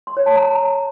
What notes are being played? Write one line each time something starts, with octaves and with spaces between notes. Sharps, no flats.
C6
C#5
A5
A#5